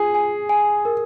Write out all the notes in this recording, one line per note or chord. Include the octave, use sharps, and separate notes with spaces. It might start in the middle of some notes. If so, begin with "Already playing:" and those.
Already playing: F4 G#4
G#5
G#5
A#4